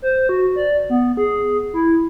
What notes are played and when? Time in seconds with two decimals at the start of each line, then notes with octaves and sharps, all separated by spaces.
0.02 C5
0.29 F#4
0.56 D5
0.90 B3
1.17 G#4
1.74 E4